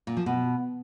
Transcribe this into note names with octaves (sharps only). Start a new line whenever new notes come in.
A#2
F3
B2